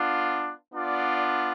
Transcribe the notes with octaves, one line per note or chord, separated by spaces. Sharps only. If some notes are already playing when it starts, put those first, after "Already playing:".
Already playing: B3 D4 F4
B3 D4 F4 D5